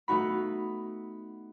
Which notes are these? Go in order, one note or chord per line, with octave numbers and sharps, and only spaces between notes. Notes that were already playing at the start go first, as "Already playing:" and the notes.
A3 B3 D#4 F#4 B5